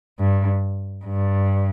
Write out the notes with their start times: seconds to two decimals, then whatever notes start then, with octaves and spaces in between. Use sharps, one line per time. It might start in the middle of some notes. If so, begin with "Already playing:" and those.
0.19 G2
1.05 G2